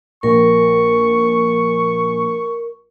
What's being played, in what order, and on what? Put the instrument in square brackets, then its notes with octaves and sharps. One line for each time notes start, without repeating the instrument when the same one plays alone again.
[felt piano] A#1 [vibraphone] A#4 [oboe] C#6